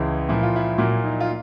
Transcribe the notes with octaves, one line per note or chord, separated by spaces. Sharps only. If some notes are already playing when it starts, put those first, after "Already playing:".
Already playing: C#2 C#3 E3 G#3 E4
A#2 F3 A#3 E4
F4
E4
A#2 F#3 A#3 E4
D#4
F4